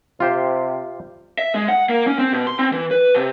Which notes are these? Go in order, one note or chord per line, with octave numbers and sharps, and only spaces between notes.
C3 F4 G4 C5
E5
G#3
F#5
A#3
C#4
C4
B2
C6
C4
E3
B4
C3